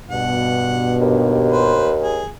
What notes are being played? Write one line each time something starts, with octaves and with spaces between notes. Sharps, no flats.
G2 B2 F#5
D#2
B4 C5
G#4